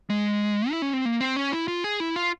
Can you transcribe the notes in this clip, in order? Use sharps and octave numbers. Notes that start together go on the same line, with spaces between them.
G#3
E4
C#4
C4
A#3
C4
C#4
E4
F4
G#4
E4
F4